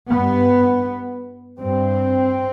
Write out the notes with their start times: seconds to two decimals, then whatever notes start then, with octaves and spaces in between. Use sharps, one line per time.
0.10 G2 B3
1.58 G2 C4